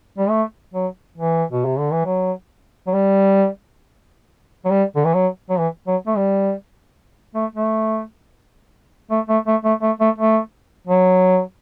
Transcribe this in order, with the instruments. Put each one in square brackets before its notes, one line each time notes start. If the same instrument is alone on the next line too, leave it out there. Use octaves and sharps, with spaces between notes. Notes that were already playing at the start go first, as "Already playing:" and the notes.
[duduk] G3
A3
F#3
E3
B2
C3
D3
E3
F#3
F#3
G3
F#3
G3
D3
E3
F#3
F#3
E3
F#3
A3
G3
A3
A3
A3
A3
A3
A3
A3
A3
A3
F#3